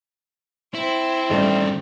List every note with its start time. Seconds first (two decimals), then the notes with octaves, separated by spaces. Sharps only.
0.75 C4 E4
1.30 A1 G2 D#3 G3 A3